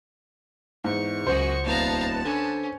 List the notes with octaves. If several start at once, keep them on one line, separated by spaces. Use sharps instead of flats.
E2 G#2 C#6
C#2 F#2 F#4 G#4 C5
D#1 B3 F5 A5 A#5
D3 C#4